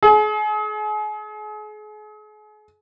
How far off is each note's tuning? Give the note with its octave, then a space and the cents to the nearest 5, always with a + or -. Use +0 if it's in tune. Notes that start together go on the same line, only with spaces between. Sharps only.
G#4 +35